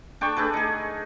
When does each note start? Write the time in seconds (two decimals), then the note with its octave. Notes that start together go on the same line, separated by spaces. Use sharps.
0.21 D4 G5 A5 C#6
0.37 A3 D4 G#4 B4
0.53 D#4 G#4